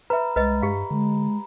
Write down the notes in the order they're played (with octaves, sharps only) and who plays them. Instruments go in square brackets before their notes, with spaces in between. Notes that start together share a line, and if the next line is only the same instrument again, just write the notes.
[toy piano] B4 E5 [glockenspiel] A#5 B5
[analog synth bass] C2 [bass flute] G#3 [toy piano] B4 D#5
[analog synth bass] G2 [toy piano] G4 F5
[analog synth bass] D3 [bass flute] G#3